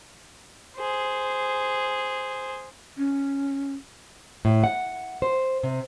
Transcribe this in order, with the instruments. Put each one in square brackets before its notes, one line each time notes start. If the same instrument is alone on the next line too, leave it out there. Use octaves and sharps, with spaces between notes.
[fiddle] G#4 C5
[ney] C#4
[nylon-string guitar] A2
F#5
C5
C3